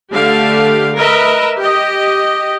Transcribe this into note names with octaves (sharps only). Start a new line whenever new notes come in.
D3 A3 G4 F5
A#4 B4 D#5 E5
G4 D#5